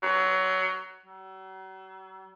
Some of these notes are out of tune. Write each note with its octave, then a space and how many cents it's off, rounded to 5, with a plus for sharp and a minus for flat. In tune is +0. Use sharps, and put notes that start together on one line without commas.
F#3 +20
F#3 +45